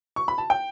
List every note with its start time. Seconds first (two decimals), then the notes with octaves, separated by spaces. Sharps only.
0.16 C#6
0.28 B5
0.38 A5
0.50 G5